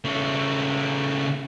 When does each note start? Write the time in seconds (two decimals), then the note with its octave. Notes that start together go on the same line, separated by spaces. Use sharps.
0.04 C#3 A3